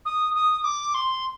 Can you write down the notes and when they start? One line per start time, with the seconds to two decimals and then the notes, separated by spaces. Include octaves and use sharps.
0.05 D#6
0.34 D#6
0.64 D6
0.94 C6